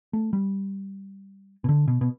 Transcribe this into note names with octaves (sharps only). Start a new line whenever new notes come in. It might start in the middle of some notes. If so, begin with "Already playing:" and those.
A3
G3
B2
D3
B2
B2